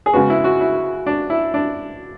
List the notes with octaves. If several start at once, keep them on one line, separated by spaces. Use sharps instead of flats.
G#4
C#3 G#3 B3 F#4
E4
F#4
E4
D4
E4
D4